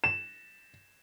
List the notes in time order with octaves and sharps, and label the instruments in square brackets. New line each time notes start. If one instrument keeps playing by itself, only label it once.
[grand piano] E7